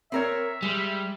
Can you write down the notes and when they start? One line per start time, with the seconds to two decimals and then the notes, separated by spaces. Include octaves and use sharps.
0.12 C4 A#4 C#5 E5
0.62 G3 G#3